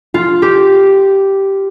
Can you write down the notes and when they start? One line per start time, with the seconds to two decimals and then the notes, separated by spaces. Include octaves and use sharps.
0.14 F4
0.42 G4